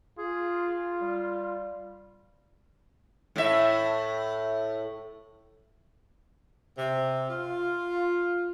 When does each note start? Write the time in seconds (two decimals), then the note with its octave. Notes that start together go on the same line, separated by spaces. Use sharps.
0.18 F4 G#4
1.01 G3
3.36 A2 E5
6.78 C3
7.28 F4